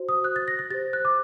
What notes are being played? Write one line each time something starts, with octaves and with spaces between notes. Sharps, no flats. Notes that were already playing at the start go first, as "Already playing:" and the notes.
Already playing: F#4 C5
D#6
F#6
A6
A#6
A#6
G4 C5 A6
F#6
D6